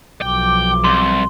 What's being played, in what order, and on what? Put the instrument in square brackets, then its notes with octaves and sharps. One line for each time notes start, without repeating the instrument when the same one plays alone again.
[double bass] B1 F3 [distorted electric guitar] G5 [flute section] D6
[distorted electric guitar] C2 [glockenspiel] C6